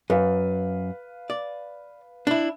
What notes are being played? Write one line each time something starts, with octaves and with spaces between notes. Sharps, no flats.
F#2 B4 F5
D5
D4 E4